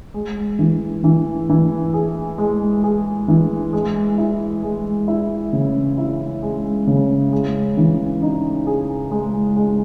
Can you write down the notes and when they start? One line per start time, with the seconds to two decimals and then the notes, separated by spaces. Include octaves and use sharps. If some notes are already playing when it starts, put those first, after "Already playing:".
0.14 G#3
0.59 E3
1.04 E3
1.49 E3
1.94 G#4
2.38 G#3
2.83 G#4
3.28 E3
3.73 G#3
4.18 E4
4.63 G#3
5.08 E4
5.53 C#3
5.98 E4
6.42 G#3
6.87 C#3
7.32 G#3
7.77 E3
8.22 D#4
8.67 G#4
9.11 G#3
9.56 G#3